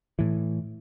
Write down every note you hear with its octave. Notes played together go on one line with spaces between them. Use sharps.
A2 E3